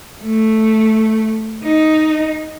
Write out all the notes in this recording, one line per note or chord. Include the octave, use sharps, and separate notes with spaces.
A3
D#4